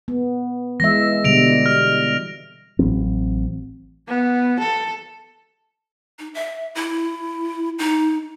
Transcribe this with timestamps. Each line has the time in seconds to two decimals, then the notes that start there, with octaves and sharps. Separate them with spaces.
0.08 B3
0.80 E3 G#3 E5 A#6
1.24 B2 D3 G3 D7 F7
1.66 F6
2.79 A1 F#3 C4
4.08 B3
4.60 A4
6.19 D#4
6.34 E5
6.75 E4
7.79 D#4